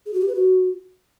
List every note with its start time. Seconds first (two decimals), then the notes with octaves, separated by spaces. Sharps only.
0.06 G#4
0.13 F#4
0.21 G4
0.28 B4
0.35 F#4